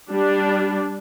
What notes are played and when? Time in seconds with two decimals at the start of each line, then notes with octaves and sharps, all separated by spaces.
0.11 G3 D4